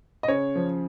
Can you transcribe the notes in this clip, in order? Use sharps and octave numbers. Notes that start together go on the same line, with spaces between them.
D#5
C#3 C#5
F3